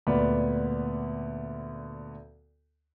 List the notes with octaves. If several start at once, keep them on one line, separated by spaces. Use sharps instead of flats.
D2 A#2 B3 D5 B5